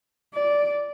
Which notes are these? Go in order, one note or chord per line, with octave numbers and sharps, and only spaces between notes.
D5